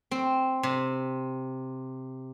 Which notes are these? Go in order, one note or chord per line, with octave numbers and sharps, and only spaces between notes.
C4
C3